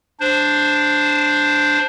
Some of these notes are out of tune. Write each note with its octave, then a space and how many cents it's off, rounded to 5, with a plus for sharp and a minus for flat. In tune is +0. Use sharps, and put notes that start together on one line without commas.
D4 +0 C5 +0